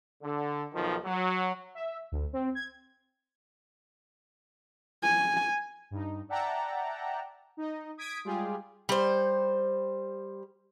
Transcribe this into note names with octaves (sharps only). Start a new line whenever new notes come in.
D3
B1 D#3 F3
F#3
E5
D2
C4
G#6
G#5
G2 D#4
D5 E5 F#5 G5 A5 A#5
D#4 D#5
D#6 G#6 B6 D7
G3 G#3 F4 G4 G#4
G3 C5